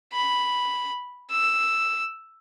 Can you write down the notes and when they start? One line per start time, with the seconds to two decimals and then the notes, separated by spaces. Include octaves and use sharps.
0.13 B5
1.30 E6